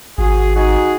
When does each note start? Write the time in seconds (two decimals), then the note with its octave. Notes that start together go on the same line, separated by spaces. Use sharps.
0.18 G#1 F#4 G#4
0.56 D#4 F#4 G#4